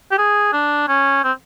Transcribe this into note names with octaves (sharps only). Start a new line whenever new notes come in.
G4
G#4
D4
C#4
C4